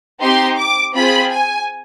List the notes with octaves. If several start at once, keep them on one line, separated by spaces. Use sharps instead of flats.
C4 D#4 G4 C6
D6
C4 F4 G#4 B5
G#5